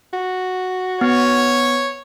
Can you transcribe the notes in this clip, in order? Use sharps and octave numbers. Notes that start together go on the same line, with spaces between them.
F#4
B3 C#5